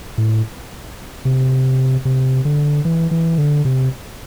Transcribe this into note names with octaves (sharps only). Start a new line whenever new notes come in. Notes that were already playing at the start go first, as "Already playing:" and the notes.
A2
C3
C3
D3
E3
E3
D3
C3